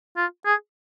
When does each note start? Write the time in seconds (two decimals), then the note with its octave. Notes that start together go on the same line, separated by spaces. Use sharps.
0.17 F4
0.46 G#4